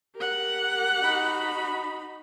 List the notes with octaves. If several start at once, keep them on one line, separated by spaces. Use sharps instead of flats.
G4 A#4 F#5
D#4 F#4 B5